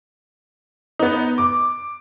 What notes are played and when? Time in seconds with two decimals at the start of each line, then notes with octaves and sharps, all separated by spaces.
0.99 B3 D#4
1.38 D6